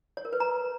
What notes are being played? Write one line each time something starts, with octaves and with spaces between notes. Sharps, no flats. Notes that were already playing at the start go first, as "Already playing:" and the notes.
C#5
A#4
B4
A#5